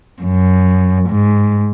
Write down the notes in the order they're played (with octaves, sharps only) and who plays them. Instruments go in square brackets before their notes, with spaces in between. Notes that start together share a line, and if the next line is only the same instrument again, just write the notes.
[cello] F#2
G#2